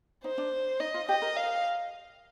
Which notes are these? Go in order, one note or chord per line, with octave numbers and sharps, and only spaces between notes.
D#4 C5
D4
D#4 D#5
F4
G4 D#5
A#4
F5